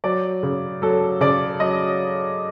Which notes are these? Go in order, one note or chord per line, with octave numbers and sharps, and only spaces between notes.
F#3 D5
C#3
F#3 A4
C#3 D5
F#3 D#5